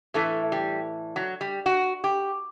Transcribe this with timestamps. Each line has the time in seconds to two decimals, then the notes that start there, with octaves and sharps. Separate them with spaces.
0.14 A2 E3 A3
0.52 G3
1.16 F#3
1.41 G3
1.66 F#4
2.04 G4